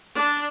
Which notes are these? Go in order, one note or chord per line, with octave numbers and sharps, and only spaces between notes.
D4